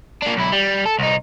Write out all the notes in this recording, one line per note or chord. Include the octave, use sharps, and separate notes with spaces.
A#3 D4
B1 E4
G3
A4
C2 D#4